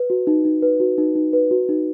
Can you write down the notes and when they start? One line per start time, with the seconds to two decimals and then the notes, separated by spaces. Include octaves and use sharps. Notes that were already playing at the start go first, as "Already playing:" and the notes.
Already playing: B4
0.10 F#4
0.27 D#4
0.45 D#4
0.62 B4
0.80 F#4
0.98 D#4
1.15 D#4
1.33 B4
1.51 F#4
1.69 D#4